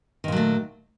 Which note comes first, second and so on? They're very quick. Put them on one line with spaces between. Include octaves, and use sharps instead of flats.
D#3 A#2 F#3 A3